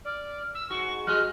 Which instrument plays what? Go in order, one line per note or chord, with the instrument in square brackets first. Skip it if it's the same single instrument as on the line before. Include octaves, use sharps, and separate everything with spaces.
[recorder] D5 [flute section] F6
[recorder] E6
[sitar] G#2 F#4 [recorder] C#6
[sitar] G3 D#5 [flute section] F#4 G#4 [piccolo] F6 [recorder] F#6